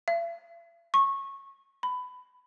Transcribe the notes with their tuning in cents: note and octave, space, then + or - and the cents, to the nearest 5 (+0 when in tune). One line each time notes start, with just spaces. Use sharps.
E5 +45
C#6 -20
B5 +20